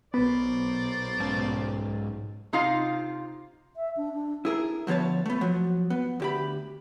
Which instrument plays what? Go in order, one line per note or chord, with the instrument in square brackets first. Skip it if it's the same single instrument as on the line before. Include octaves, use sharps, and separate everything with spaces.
[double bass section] B1 [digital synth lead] B3 [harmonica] A#4 C5 D5
[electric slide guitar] G#2 C#4 A5
[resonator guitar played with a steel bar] C3 D#4 F4 F5
[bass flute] E5
D4
D4
[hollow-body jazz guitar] E4 G#4 A#4
D2 F3 B3 C#5 A5
A3 B3
F3 F#3
B3
D2 G4 B5